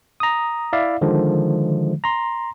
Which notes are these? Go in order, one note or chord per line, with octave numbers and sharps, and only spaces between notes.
A#5 D#6
E4 D5 E5 F5
D3 D#3 F3 G#3
A#5 C6